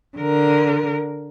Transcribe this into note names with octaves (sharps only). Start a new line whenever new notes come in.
D3 A#4